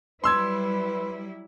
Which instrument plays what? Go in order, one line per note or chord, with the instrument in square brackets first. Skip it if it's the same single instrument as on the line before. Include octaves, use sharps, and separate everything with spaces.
[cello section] F#3 G3 E4 [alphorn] B4 [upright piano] C6 E6 G#6